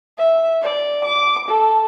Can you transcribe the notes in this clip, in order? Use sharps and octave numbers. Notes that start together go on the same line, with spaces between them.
E5
D5
D6
A4